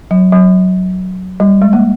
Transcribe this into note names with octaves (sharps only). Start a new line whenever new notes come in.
F#3
F#3
G3
G#3
A#3